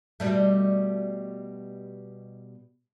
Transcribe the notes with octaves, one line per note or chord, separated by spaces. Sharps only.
B2 G3 A3